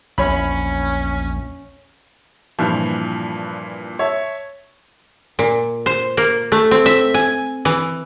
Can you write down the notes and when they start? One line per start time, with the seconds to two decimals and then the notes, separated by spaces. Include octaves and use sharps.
0.18 A#1 E2 C#4 C#5 B5
2.59 G2 A#2 E3 F3
3.99 C#5 E5 A5
5.39 A#2
5.86 C5
6.17 A#3
6.52 A3
6.71 C4
6.86 E5
7.14 G#5
7.65 E3